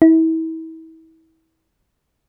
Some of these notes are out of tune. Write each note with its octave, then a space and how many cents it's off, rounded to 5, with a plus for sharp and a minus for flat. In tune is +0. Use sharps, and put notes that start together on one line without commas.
E4 -35